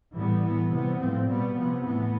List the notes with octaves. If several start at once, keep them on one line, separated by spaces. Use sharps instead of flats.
A2 E3 G3 B3
A2 E3 B3
C3 E3 G3 B3
A2 F3 C4
B2 G3 B3
C3 F3 B3
A2 E3 B3